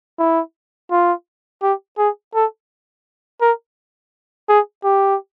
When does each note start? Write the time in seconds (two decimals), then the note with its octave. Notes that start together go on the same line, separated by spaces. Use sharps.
0.19 E4
0.91 F4
1.62 G4
1.98 G#4
2.35 A4
3.41 A#4
4.49 G#4
4.84 G4